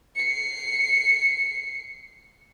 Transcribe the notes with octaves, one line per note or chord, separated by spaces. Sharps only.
C7 C#7